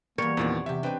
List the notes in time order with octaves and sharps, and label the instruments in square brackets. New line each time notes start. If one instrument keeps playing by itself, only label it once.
[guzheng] E2 G3 [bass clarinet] A#3 [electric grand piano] A#4 [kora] C#5
[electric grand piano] E2 A#2 D#3 [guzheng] C4 D5 F#5
[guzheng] E2 G4 [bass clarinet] C3 [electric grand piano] E5
[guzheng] C4 D#4 [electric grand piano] D4 B4 G5